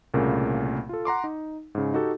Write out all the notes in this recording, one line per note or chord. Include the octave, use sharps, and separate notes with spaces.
C2 A#2 C#3 A3 A#3
F4 A4
F#5 A#5 C6 D6
D#4
G#2 C#3
D#4 F#4 G4 A4